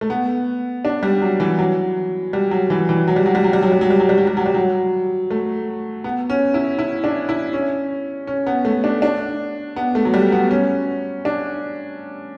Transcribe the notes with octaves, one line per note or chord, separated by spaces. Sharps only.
A3
B3
D4
G3
F#3
E3
F#3
G3
F#3
E3
E3
F#3
G3
F#3
G3
F#3
G3
F#3
G3
F#3
G3
F#3
G3
F#3
G3
F#3
G3
F#3
A3
B3
C#4
E4
E4
D4
E4
C#4
C#4
B3
A3
D4
D4
B3
A3
F#3
G3
B3
C#4
D4